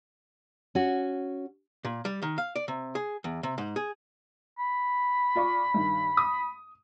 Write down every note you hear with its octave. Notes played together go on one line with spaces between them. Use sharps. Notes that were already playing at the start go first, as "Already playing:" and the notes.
C#4 F#4
A#2
G3
D#3
F5
D5
C3
G#4
E2
C3
G#2
G#4
B5
F4 D5 C#6
G2 D#3
D#6